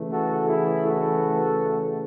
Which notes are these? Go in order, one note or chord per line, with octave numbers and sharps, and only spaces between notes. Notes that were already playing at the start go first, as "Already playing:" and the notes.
Already playing: C#3 E3 A3
F#4 A4
E4 G#4
F#4 A4